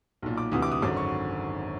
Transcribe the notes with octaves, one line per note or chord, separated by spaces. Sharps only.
B1 A#2
D6
D2 C3 E3 D#6
D6
D#6
G#1 F#2 D3 D6
C#6